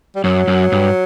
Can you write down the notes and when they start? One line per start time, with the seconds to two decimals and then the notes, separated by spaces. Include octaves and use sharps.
0.15 G3
0.24 F#2 F#3
0.47 F#2
0.72 G2